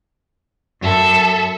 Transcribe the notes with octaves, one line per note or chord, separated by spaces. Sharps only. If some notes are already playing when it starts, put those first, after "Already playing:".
F#2 A4 E5